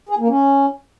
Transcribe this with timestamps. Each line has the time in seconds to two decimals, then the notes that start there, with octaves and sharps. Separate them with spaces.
0.09 G#4
0.19 A#3
0.28 C#4